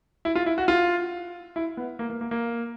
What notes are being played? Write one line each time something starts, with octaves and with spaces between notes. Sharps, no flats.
E4
F4
E4
F#4
F4
E4
B3
A#3
A#3
A#3
A#3